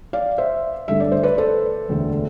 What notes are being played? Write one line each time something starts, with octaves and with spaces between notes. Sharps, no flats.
D5 F5
C5 E5
G2 D3 A3 D4 E5
D5
C5
B4 D5
A4 C5
E1 D2 D3 A3